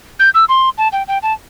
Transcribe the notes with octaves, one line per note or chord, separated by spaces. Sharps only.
G6
E6
C6
A5
G5
G5
A5